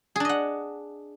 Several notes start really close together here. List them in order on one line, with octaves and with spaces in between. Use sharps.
G#4 D4 D#5 F#5